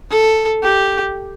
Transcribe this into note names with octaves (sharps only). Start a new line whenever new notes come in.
A4
G4